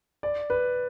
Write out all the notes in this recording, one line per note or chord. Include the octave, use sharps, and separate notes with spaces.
D5
B4